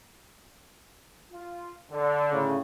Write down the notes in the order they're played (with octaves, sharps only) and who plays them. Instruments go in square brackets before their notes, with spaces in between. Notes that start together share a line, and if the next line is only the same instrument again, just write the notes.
[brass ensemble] F4
D3
[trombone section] A2 C#3